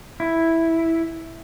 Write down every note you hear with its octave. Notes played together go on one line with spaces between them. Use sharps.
E4